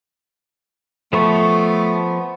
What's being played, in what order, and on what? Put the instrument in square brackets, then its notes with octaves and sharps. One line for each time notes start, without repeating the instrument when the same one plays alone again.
[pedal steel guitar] F3 B3 C#6 [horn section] A3